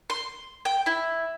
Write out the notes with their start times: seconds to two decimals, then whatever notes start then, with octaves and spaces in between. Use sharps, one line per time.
0.10 C6
0.65 G5
0.86 E4